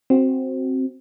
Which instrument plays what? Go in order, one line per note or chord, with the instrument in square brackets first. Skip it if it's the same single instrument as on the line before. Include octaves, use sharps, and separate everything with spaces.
[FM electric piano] C4 F#4